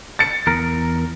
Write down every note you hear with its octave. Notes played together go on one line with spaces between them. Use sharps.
A6 C#7
E2 A#4